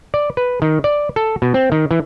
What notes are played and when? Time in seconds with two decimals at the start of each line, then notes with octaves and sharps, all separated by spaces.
0.14 D5
0.37 B4
0.62 D#3
0.84 D5
1.16 A4
1.42 B2
1.54 C4
1.72 D#3
1.91 E3